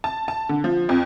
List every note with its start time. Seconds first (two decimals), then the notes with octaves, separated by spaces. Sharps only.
0.04 A5
0.28 A5
0.49 D3
0.64 F3
0.89 F2